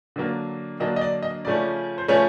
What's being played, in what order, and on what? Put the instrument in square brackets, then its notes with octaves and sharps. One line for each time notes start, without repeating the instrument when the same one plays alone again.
[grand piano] D3 F#3 A#3 D4
D3 F#3 A#3 D4 D#5
D#5
D5
D#5
C#3 F3 A3 C#4 D5
C5
C#3 F3 A3 C#4 C#5